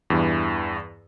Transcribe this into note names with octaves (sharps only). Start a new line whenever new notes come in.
E2 G2 E3